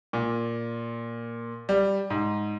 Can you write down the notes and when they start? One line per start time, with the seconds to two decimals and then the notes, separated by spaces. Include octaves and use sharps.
0.13 A#2
1.69 G3
2.10 G#2